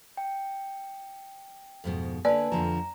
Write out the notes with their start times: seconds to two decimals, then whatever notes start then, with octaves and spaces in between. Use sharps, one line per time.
0.17 G5
1.84 F2 G#2 B2
2.25 D3 A#3 B4 D5 G#5 A5
2.52 F2 D3 F3 A#5